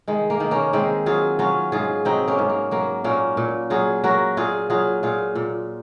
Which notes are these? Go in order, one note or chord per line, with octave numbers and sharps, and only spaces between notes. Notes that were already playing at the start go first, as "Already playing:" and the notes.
D#3 G#3
A#3
D#3
A#3 C#4
D#3 G#3 C4
F#3 F4 G#4
F#3 C#4 F4
G#2 F4 G#4
F#3 C4 D#4
A#3 C#4
G#2
A#3
F#3 A#3
A#2 A#3 C#4
A#2
F#3 F4 G#4
F#3 F#4 A#4
A#2 F4 G#4
F#3 F4 G#4
A#2 F4 G#4
A#2